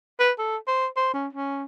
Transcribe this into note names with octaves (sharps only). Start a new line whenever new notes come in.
B4
A4
C5
C5
C#4
C#4